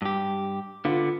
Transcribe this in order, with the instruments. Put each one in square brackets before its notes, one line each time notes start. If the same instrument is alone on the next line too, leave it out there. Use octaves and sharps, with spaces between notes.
[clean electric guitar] G2 G4
[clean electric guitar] D3 B3 [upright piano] F4